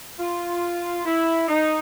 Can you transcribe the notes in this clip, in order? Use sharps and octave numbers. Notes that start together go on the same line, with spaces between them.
F4
E4
D#4